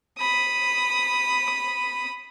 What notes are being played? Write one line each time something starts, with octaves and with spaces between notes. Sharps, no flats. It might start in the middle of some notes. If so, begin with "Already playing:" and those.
B5 D#6